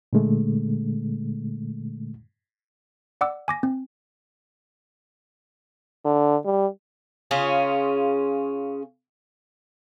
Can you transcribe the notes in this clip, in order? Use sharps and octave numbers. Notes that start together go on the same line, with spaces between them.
A#2 D3 G#3 A3
D5 F#5 D6 E6
G#5 D6 A#6
C4
D3
G3
C#3 C#4 F4 G#4